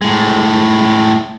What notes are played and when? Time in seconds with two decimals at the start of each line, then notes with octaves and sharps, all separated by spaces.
0.02 A2 G#3